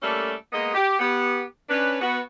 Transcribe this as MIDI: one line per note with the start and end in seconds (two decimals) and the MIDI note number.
0.02 0.34 55
0.02 0.34 57
0.02 0.34 58
0.02 0.34 61
0.02 0.34 69
0.02 0.34 74
0.53 0.72 56
0.53 0.72 58
0.53 0.72 59
0.53 0.72 75
0.74 0.98 67
1.00 1.42 59
1.00 1.42 67
1.69 1.99 61
1.69 1.99 62
1.69 1.99 71
2.01 2.19 59
2.01 2.19 66